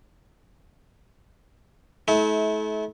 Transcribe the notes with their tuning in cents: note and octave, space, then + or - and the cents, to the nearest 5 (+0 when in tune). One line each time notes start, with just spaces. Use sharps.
A3 -35 E4 -40